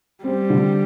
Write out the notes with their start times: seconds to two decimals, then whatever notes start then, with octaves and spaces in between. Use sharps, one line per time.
0.24 G3 C4
0.50 D3